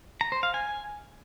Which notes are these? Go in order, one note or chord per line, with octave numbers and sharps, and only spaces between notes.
A#5
C5
F5
G#5